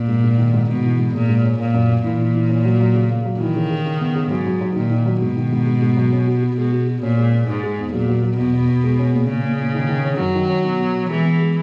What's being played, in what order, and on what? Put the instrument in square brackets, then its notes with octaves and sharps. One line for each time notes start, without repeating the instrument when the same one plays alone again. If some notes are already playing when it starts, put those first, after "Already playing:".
Already playing: [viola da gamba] A#2
[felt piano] G#2
G#2
D#3
G#2
[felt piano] G#2 [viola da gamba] B2
[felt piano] E3
G#2
[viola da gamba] A#2 [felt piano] G#3
[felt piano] G#2
C#4
[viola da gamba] A#2 [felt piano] A#3
[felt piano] F#2
A#3
[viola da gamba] A#2 [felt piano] E3
[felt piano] E3
E3
C#4
F#3
F#3
C#3
A#3
F#3
[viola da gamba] D#3 [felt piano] E3
[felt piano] C#3
C#3
C#3
B3
C#3
[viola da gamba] G#2 [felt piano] F#3
[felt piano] F#3
F#3
[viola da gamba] A#2 [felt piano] D#3
[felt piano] D#3
F#3
[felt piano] G#2 [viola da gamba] B2
[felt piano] D#3
G#2
G#2
G#2
F#3
C#4
F#4
F#4
[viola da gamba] B2 [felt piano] G#3
[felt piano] F#4
F#4
[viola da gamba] A#2 [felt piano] C#4
[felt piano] G#3
C#4
[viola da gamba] G#2 [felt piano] G#3
[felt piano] G#3
E2
[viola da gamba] A#2 [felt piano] F#3
[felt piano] F#3
F#3
[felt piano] E2 [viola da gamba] B2
[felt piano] E2
E2
G#3
C#4
A#2
[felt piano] A#2 [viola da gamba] C#3
[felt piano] A#2
A#2
D#3
D#3
C#4
[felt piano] F#2 [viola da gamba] F#3
[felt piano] D#3
C#4
B2
B3
B2
[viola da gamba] E3 [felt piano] G#3
[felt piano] B3
G#3